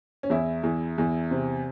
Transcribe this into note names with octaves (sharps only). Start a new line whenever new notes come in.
C#4
E2 E4
E2
E2
C3